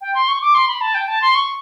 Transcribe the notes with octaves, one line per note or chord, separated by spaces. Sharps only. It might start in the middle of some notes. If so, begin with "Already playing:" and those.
G5
C6
C#6
D6
C6
B5
A5
G5
A5
C6
C#6